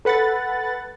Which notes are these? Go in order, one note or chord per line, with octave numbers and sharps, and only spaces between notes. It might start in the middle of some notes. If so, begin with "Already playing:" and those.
A4 B4 F#5 B5 A6